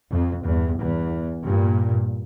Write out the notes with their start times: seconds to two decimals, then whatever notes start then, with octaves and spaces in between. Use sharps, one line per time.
0.10 F2
0.43 E2 G2
0.78 E2
1.45 G2 A#2